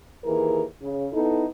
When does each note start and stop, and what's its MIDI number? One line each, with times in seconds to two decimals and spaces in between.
0.24 0.62 39
0.24 0.62 52
0.24 0.62 68
0.24 0.62 70
0.80 1.07 49
1.11 1.45 59
1.11 1.45 63
1.11 1.45 64
1.11 1.45 69